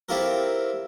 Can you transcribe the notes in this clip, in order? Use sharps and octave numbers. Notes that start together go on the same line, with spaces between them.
C4 E4 F4 G4 A4 A#4